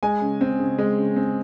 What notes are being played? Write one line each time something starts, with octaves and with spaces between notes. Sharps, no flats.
G#3 G#5
C#3
C4
C#3
G#3
C#3
C4